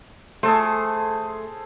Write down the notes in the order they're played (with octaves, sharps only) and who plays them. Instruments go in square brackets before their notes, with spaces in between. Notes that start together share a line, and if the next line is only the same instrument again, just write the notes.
[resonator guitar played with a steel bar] A3 [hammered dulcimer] G#4 A4 C5